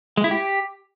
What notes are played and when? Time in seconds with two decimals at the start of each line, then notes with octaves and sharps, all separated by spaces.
0.17 G#3
0.24 E4
0.31 G4